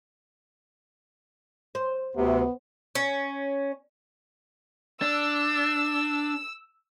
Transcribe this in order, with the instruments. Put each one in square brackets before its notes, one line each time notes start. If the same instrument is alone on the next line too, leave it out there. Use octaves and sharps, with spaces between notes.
[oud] C5
[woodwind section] D2 C3 [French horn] B3
[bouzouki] C#4
[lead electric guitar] D4 [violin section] E6